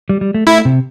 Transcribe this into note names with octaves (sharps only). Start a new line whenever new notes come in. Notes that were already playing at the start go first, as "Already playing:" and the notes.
G3
G3
A3
A3 E4
C3